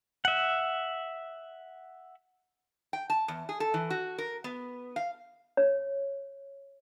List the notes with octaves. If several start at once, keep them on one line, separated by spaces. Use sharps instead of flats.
E5 F#5
G5
A5
E2
G#4
A4
E3
F#4
A#4
B3
F5
C#5